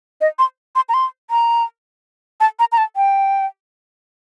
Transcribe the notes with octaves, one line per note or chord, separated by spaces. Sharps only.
D#5
C6
C6
A#5
C6
A#5
A5
A#5
A#5
A5
G5